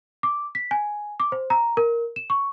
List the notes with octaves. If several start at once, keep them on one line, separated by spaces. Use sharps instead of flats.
D6
B6
G#5
D6
C5
A#5
A#4
E7
C#6